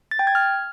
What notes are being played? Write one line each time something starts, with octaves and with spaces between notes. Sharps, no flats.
A6
G5
G#6
F6